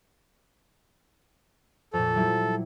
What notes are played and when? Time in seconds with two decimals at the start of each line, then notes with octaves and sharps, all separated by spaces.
1.93 F2 A#2 A4
2.14 F#3 G3 E4